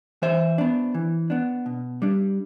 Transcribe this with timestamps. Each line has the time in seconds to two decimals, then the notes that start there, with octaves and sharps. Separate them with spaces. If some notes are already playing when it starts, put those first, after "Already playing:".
0.22 E3 C5 E5
0.58 B3 D4
0.94 E3
1.30 B3 D4
1.66 B2
2.02 G3 D4